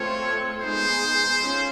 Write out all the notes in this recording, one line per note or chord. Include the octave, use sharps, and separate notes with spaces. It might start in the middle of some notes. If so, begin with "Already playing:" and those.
Already playing: A3 C4 F4 A4 C#5
G#3 B3 D#4 G#4 C5
C#4 F4 A4